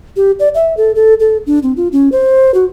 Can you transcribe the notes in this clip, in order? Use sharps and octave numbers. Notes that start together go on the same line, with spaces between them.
G4
D5
E5
A4
A4
A4
D4
C4
F4
C#4
C5
F#4